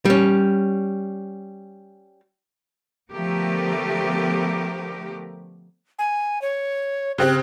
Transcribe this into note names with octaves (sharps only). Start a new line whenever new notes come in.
G3 C#4
D3 F3 A3 B3 G4 A#4
G#5
C#5
C#3 C4 G4 F#6